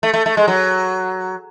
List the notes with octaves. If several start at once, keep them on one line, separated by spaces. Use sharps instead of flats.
A3
A3
A3
G#3
F#3